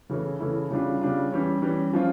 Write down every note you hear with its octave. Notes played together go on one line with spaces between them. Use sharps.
C#3 E3 A3 C#4 E4
C#3 E3 A3 C#4 E4
C#3 G3 D4 F4
C#3 G3 D4 F4
E3 G3 C#4
E3 G3 C#4
F3 C#4 F4